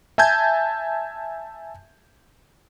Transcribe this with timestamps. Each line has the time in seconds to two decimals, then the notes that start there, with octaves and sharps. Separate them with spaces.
0.18 E5 G#5 A5 G6 G#6